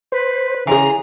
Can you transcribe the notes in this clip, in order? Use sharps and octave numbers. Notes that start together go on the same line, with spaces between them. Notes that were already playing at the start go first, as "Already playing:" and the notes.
B4 C5
C#3 E3 G#4 A#5 C6